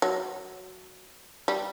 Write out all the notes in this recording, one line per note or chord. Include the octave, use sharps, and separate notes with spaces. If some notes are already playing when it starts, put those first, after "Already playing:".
F#3
G3